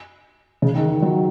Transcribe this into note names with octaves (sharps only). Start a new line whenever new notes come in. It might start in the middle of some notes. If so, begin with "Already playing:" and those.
C#3
D#3
D#3
F#3